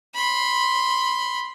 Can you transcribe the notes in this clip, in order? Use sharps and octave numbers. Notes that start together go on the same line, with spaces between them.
B5 C6